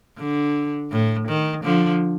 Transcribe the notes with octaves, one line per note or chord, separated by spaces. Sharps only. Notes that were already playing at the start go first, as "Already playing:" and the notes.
D3
A2
D#3
D3 F3